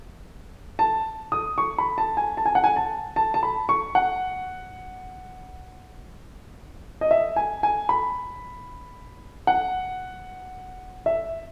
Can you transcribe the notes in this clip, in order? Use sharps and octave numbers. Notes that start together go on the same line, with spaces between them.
A5
D#6
C#6
B5
A5
G#5
A5
G#5
F#5
G#5
A5
A5
A5
B5
C#6
F#5
D#5
E5
G#5
G#5
B5
F#5
E5